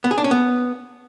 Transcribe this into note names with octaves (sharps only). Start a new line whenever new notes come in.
B3
G#4
D4
C#4
B3